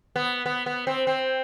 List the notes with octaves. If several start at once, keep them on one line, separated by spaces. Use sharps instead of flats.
B3
B3
B3
C4
C4